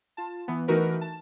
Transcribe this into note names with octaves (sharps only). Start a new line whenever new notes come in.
F4 A5
E3 B3
E3 A3 D#4 F#4 A#4 B4
A5